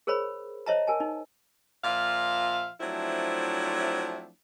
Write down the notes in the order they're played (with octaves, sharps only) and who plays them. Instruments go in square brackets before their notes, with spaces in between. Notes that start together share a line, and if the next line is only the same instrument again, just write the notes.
[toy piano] G#4 A#4 C5 C#5 B5
C5 C#5 D#5 E5 A5 A#5
A#4 G#5 A5
D#4
[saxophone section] A#2 F3 F4 E5 F5
F3 F#3 A3 C4 D4 E4